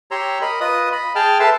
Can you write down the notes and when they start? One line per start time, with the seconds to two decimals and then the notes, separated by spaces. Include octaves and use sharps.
0.11 G4 C#5 A#5 C6 E6
0.41 A#4 D#5 B5
0.60 F4 B4 D#5 D#6
0.92 D#5 B5
1.15 G#4 G5 A5 F6
1.40 A4 B4 E5 A5 C6 E6